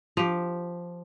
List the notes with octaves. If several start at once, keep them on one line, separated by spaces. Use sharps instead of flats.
F3 G4